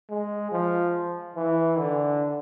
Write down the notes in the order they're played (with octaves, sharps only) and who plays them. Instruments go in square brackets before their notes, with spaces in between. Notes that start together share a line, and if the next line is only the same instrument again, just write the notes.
[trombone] G#3
F3
E3
D3